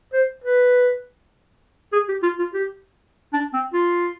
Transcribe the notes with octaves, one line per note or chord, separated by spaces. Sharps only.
C5
B4
G#4
G4
F4
F4
G4
D4
C4
F4